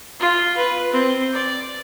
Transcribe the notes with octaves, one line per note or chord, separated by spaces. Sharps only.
F4
B4
C4
D5